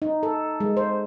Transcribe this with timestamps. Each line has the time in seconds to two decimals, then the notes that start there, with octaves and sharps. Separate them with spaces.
0.02 D#4
0.23 A4
0.60 G#3
0.77 C5